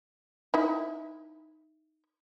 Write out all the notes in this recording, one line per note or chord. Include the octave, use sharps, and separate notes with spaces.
D#4 E4